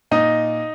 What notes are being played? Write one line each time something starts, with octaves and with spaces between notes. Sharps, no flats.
A#2 D#4 D#5